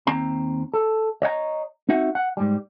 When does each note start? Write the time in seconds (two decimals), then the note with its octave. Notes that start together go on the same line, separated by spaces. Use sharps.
0.07 D#2 C4 A#5
0.74 A4
1.22 C#5 D#5 F#5 A#5
1.89 C4 D#4 F#4 E5 F#5
2.15 F#5
2.37 G#2 G3